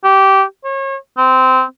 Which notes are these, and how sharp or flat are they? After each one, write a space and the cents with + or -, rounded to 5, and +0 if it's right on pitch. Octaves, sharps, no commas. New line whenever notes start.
G4 -20
C#5 -35
C4 -15